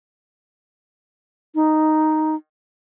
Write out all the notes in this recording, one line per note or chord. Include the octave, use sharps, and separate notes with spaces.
D#4